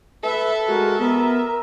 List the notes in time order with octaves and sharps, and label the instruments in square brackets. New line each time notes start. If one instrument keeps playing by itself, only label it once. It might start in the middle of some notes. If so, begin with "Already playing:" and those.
[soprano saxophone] A4 [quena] B4 [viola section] E5
[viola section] G#3 [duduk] F#4 [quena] A#4
[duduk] B3 [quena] A#4 [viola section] E5